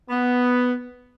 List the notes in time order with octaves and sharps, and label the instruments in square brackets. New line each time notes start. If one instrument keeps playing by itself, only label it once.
[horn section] B3